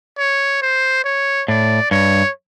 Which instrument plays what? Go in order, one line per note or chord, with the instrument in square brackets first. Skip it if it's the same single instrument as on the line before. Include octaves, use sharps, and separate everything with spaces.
[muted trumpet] C#5
C5
C#5
[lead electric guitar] A2 [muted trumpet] D5
[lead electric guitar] G2 [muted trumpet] C#5